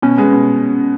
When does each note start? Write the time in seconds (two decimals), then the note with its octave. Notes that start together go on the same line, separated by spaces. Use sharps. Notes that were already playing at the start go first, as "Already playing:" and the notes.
0.02 B2 C#4
0.18 G#3 B3
0.33 B2